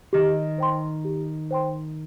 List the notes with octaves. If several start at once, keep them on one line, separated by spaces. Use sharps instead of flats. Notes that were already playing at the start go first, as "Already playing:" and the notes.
D#3 G4
C5 G5 C6
G4
C5 G5 C6